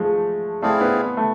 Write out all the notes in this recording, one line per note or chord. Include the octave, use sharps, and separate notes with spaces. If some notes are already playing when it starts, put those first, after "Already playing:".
Already playing: F3 G#3 A3
A3 C4 E4 G#4 D5 F5
B3
A3